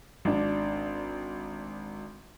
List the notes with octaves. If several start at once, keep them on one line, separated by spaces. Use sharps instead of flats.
G#1 D4